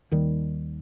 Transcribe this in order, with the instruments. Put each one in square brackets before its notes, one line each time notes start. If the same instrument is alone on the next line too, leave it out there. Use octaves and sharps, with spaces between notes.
[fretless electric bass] D#2 D#3 G3